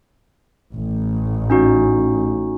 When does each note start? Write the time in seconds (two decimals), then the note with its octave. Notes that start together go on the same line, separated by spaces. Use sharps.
0.74 A1
1.50 C#4 D#4 F#4